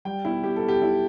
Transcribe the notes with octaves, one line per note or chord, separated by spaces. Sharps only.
G3 G5
B2 E4
B2 G4
A4
B2
G4
B2 E4